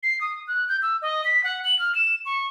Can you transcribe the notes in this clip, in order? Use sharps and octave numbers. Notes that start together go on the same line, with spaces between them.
C7
D#6
F#6
G6
E6
D#5
B6
F#5
F#7
F6
E7
C#6